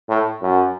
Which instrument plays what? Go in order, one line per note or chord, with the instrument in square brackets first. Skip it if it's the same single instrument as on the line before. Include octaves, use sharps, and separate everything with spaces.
[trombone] A2
F#2